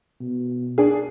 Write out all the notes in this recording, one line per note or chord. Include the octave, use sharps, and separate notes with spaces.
B2
D4 G#4